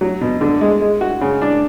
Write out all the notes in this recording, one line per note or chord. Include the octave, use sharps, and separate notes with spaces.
F#3
B2
D3
G#3
G#3
F#4
C#3
D4